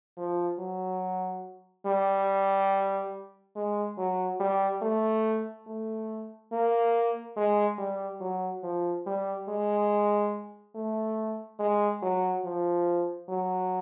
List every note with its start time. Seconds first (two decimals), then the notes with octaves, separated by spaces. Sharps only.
0.17 F3
0.59 F#3
1.86 G3
3.56 G#3
3.98 F#3
4.40 G3
4.82 A3
5.67 A3
6.52 A#3
7.36 G#3
7.78 G3
8.21 F#3
8.63 F3
9.06 G3
9.49 G#3
10.75 A3
11.59 G#3
12.03 F#3
12.45 F3
13.29 F#3